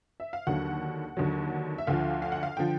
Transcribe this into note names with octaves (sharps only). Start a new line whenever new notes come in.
E5
F5
D#2 D3 F#3 F#5
D#2 D3 F#3
E5
D2 D3 F3 F5
F5
F#5
F5
D3 F3 G5